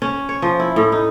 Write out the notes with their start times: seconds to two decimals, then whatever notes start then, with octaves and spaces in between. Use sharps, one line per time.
0.02 C#4
0.29 C#5
0.42 F3
0.60 E4
0.76 A2
0.92 D#4